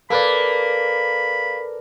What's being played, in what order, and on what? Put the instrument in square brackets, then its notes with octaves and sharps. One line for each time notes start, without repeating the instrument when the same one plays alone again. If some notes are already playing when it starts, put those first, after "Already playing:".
[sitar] A#3 [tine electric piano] A4 B4 D5 [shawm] B5